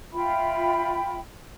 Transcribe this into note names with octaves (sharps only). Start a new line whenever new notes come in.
F4 E5 G5 B5